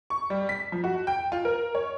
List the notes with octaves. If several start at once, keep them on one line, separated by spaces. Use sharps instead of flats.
C#6
G3
B6
F3
F#4
G5
F4
A#4
C#5